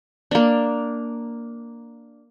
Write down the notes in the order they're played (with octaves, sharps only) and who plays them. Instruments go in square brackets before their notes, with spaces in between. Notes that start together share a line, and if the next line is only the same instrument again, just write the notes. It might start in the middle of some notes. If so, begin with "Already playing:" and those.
[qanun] A#3 D4